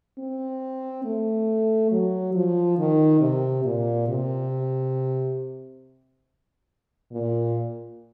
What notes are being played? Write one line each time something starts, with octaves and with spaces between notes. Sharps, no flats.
C4
A3
F#3
F3
D#3
C3
A#2
C3
A#2